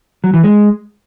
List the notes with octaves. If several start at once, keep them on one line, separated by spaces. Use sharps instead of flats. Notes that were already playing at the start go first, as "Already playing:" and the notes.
F#3
E3
G#3